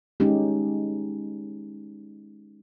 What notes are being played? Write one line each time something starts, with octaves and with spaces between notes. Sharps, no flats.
G#3 C#4 D#4 G4